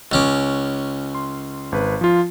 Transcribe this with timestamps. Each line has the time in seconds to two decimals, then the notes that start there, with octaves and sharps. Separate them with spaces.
0.12 C#2 C#4 D6
1.15 C6
1.72 G#1 B4
2.01 F3 F4